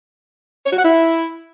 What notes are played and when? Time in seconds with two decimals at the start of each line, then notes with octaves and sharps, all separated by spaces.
0.66 C#5
0.73 F#4
0.79 F#5
0.85 E4